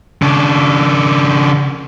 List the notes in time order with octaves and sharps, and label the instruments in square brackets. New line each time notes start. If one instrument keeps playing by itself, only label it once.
[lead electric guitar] C#3 D4